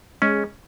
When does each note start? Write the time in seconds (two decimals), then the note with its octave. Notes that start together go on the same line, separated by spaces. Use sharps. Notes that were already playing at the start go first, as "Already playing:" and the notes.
0.22 G#3 C#4